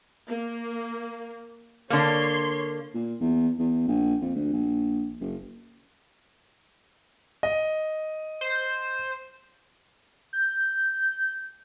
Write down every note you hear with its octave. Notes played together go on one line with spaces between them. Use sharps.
A#3
D3 A#3 C#5 C6
A#2
E2
E2
A#1
F2
D2
A#1
F#1
D#5
C5
G6